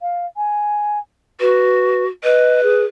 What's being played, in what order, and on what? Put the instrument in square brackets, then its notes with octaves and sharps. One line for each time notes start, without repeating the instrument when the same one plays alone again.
[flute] F5
G#5
[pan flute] F#4 [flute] B4
[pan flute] B4 [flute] D#5
[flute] G#4